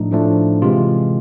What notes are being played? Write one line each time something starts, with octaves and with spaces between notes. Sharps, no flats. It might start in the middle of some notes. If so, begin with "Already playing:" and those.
Already playing: A2 F3 A3 D4 D#4
A2 F3 A3 D4
C3 E3 G#3 F4